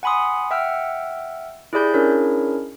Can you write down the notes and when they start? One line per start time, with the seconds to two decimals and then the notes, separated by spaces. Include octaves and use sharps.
0.03 F#5 G#5 B5 C6 D#6
0.51 E5 F#5 G5 E6 F6
1.73 E4 G4 G#4 D5 B5 G6
1.94 C#4 D4 E4 G#4 A#4 C#5